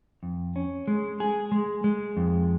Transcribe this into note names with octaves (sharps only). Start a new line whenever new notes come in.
F2
C#4
G#3
G#4
G#3
G#3
F2